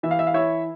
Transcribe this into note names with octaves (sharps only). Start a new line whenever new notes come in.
E3 E5
F5
E5
F5
E4 C#5 E5